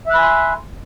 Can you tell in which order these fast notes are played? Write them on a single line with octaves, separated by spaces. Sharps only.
E5 F#6 B5 G#5 C6